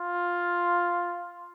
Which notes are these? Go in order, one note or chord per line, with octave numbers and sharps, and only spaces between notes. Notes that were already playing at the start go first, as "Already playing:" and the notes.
Already playing: F4